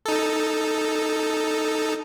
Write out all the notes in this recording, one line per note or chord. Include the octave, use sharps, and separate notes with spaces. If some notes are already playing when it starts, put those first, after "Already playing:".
D#4 A4